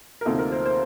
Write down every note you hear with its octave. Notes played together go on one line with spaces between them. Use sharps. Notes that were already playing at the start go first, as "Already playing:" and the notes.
A#4
D2 C3 F3 A#3 D#4 A4
A#4
C5
C5